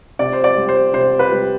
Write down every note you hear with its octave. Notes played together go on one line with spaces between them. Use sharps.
C3 D5
C5
D5
G3
C5
C3 C5
B4
G3